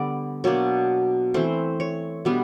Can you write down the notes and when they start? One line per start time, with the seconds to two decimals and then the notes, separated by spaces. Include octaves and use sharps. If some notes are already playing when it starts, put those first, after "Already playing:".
Already playing: D3 G3 B3 D5
0.44 B2 F#3 A#3 D4 C#5
1.34 E3 A3 C4 C5
1.80 C#5
2.25 B2 G3 B3 D4